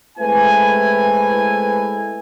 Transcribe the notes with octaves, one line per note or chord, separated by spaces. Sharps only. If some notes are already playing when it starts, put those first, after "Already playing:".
G#3 A3 C4 E4 B4 G#5